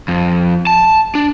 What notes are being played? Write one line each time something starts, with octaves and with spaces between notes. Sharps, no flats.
F2
A5
D4